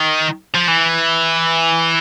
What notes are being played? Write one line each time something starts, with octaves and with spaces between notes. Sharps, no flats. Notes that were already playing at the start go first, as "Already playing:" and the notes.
Already playing: D#3
F3
E3